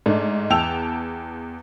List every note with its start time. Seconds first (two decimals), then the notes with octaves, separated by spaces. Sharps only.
0.06 G#2 A3 D4 D#4
0.50 E2 G5 A5 E6 F7